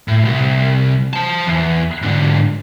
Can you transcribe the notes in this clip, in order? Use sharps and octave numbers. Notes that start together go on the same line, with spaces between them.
A2
C2
C5 A5
E2
G#2 D3